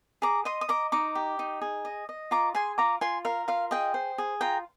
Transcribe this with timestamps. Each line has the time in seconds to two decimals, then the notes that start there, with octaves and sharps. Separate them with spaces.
0.22 G#4 A#5 D6
0.45 D#5 C6 D#6
0.61 D#6
0.69 D#5 A#5 D6
0.92 D#4 A#5 D6
1.15 G4
1.39 D#4
1.61 G#4
1.85 D#5
2.09 D#5
2.31 F4 A#5 D6
2.55 G#4 G#5 C6
2.78 F4 A#5 D6
3.01 F4 G#5 C6
3.25 A#4 F5
3.48 F4 F5
3.71 G#4 D#5 G5
3.94 C5
4.18 G#4
4.41 F4 G5 A#5